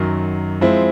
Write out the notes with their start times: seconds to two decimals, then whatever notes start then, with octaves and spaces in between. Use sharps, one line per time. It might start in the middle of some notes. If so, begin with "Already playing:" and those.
Already playing: F#2 D#3 F#3
0.61 F3 G#3 C4 E4